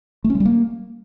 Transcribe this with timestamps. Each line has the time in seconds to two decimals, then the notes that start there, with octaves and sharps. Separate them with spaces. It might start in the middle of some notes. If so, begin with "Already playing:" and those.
0.24 A3
0.30 C#4
0.35 G#3
0.40 G3
0.45 A#3